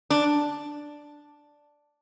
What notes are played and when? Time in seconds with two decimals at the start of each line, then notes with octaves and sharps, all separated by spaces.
0.10 D4